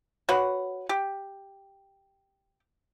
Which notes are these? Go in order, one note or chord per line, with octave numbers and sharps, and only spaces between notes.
F#4 B4 C#5 F#5
G4